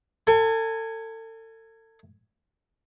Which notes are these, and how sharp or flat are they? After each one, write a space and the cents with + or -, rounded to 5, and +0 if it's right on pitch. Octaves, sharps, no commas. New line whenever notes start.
A4 +35 G#5 +0